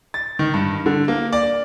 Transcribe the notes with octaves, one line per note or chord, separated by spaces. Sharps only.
A6
D#3
G2
D3
A#3
D5